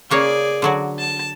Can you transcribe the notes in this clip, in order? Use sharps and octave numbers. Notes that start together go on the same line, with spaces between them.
C#3 A#3 G#4 C#5 D5
D3 F#3 F#4
A5